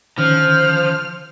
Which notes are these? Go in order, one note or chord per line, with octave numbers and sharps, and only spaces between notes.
D3 D#3 F3 C#4 C5 F6